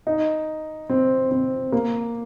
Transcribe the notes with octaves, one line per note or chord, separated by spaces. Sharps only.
D#4
C4
C4
A#3